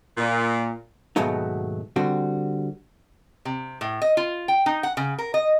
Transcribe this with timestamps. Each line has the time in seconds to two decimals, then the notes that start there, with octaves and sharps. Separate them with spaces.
0.17 A#2
1.16 D#2 G#2 B2 F#3 A3 D#4
1.96 D3 G3 C4 F#4
3.45 C3
3.81 A2
4.02 D#5
4.17 F4
4.48 G5
4.66 D#4
4.83 F#5
4.97 C#3
5.18 A#4
5.34 D#5